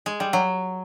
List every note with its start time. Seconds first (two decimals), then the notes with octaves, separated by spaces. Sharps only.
0.06 G#3
0.20 G3
0.33 F#3